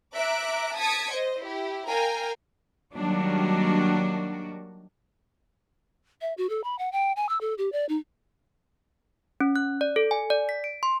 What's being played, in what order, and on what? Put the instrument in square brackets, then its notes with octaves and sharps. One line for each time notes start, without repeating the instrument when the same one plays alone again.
[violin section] E5 A#5 D6 F#6 D7
A5 D#6 G#6 B6 C#7 D7
C5 D#5
E4 G4
A#4 F5 G5 G#5 A#5
[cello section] D#3 F#3 G3 A#3 D4 F#4
[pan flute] E5
F#4
A4
B5
F#5
G5
G#5
E6
A4
G4
D5
D#4
[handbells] C#4
F#6
D5
A4
G#5
D5
B6
D7
C6